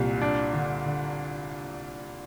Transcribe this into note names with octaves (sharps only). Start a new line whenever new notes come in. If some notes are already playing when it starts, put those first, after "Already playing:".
Already playing: C2 A#2
D4
D3
D3